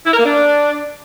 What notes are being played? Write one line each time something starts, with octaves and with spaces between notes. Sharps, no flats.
E4
A#4
A#3
D4